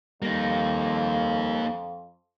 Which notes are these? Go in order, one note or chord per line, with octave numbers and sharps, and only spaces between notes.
F2 G3 A#3 D#4 A#6